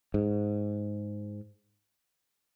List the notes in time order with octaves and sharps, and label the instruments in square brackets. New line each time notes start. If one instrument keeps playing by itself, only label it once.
[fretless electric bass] G#2